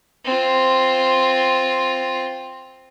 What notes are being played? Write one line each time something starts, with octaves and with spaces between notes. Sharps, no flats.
C4 F4